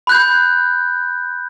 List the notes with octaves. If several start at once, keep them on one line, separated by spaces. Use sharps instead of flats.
B5 F#6 G6